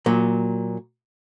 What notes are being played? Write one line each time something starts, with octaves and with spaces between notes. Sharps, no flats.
A#2 F#3